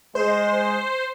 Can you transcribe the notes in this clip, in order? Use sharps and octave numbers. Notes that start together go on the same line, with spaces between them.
G#3 C5